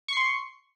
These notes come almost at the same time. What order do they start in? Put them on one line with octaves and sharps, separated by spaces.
C#6 C7 C6